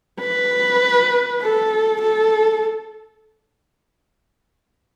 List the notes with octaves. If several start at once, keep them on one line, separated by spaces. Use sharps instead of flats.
B4
A4
A4